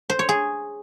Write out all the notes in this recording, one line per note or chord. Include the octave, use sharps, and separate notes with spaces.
C5
C#5
G#4